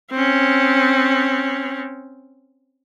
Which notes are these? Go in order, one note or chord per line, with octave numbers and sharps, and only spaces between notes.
C4 C#4